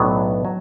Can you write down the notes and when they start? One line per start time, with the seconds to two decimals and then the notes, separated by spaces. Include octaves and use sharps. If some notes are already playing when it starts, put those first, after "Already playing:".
Already playing: B1 A2 F#3 B3 D4
0.45 F#3